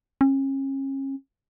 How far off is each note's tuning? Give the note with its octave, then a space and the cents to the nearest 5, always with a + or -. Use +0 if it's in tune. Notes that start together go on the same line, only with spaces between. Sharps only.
C#4 -35